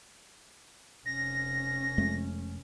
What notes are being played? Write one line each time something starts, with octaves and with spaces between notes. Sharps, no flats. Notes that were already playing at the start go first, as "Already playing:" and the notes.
F1 C#4 A#6
F2 G#3 A3